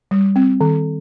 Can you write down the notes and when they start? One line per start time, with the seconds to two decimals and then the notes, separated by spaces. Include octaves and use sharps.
0.11 G3
0.36 C4
0.61 D#3